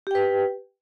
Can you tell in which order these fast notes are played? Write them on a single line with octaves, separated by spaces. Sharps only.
G4 G5 B4